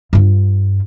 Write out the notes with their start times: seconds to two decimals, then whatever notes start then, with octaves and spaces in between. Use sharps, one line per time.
0.13 G2 F4